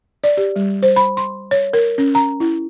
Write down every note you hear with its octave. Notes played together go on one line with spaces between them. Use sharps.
D5
G4
G3
C5
B5
C6
C#5
A#4
C#4
A#5
E4